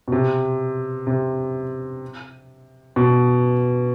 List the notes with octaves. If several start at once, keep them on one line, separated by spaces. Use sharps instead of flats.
B2
C3
C3
B2